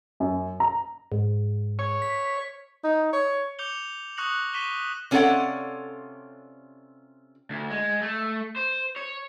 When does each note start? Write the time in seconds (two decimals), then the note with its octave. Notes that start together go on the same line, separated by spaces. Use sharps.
0.20 F#2
0.60 A#5
1.12 G#2
1.79 C#5
2.02 B6
2.84 D#4
3.13 C#5
3.59 D6 G6 C#7 F7 G7
4.17 C#6 D#6 F#6 A#6 C#7 F#7
4.54 C#6 B6 D#7 E7 G7
5.11 C3 C#4 F4 A4 D5 F#5
7.50 D2
7.71 G#3
8.02 A3
8.56 C5
8.96 C#5